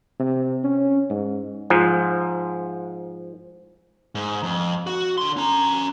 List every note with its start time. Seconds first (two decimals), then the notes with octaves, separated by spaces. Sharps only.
0.20 C3
0.63 C#4
1.10 G#2
1.70 G#2 F3
4.15 G#2
4.43 F2
4.87 F#4
5.18 D3 C6
5.37 C#4 A#5